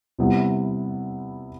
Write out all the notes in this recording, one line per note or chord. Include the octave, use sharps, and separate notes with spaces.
C3 G3 B3 E4